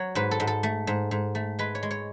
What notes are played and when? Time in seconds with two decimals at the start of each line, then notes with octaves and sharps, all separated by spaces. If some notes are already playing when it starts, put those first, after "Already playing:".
Already playing: F#3 C#5
0.15 G#2 B4
0.31 A4
0.40 G#2
0.47 A4
0.63 A3
0.87 G#2
1.11 G#2
1.35 A3
1.59 G#3 B4
1.75 C#5
1.83 G#3
1.91 C#5